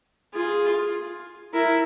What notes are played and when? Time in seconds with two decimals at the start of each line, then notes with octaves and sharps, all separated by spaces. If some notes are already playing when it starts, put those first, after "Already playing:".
0.34 F4 G#4
1.53 E4 A#4